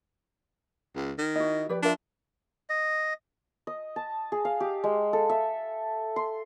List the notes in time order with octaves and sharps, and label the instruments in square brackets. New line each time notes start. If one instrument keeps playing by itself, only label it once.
[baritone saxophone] C#2
D#3
[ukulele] E4 F#4 [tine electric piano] D#5
[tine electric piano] F3 [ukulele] G4 B4 D5
[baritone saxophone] D4 [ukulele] F4 A#4 E5
[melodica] D#5
[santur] D#5
A5
G#4
F5
G4
G#3
A4
E5
C6